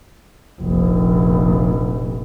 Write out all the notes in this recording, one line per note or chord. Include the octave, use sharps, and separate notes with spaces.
F1 A#1